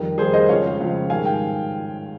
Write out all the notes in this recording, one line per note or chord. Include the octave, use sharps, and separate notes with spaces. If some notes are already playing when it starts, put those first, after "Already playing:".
Already playing: F2 D#3 G3
F2 D#3 G3 G#4 C5
C5 D#5
C#2 C#3 F3 C#5 F5
C#2 C#3 F3
G#2 D#3 G3 F5 G#5
G5